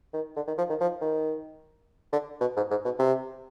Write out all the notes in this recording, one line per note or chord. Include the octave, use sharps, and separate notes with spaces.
D#3
D3
D#3
F3
D#3
F3
D#3
D3
B2
G#2
G#2
B2
C3